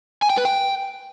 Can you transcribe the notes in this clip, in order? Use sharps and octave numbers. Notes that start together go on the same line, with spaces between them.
G#5
G5
B4
G5